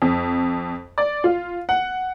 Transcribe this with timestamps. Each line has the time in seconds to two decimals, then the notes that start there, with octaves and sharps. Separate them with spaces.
0.02 F2
0.98 D5
1.24 F4
1.69 F#5